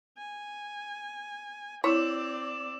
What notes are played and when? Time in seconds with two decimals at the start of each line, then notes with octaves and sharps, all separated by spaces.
0.18 G#5
1.84 C4 E4 C#5 D5 D6 E6 E7